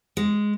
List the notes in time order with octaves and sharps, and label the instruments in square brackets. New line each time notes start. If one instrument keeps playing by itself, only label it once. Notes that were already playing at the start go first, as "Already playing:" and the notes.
[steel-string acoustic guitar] G#3